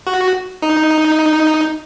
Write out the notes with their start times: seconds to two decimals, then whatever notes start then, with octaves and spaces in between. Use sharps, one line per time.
0.07 F#4
0.62 D#4